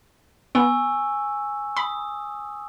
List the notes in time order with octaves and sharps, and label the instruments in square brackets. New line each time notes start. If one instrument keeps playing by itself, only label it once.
[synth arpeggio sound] B3 [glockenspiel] G#5 C#6 E6
[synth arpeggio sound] B5 [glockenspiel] D#6